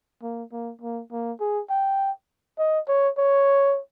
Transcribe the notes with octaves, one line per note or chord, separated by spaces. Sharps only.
A#3
A#3
A#3
A#3
G#4
G5
D#5
C#5
C#5